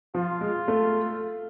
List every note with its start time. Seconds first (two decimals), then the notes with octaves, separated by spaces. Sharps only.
0.14 F3 F4
0.41 G#3
0.68 A3